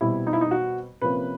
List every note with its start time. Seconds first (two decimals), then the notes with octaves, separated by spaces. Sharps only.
0.01 B2 G3 C4 E4
0.27 D#4
0.33 E4
0.41 D#4
0.51 F#4
1.02 C3 F3 A#3 C#4 B4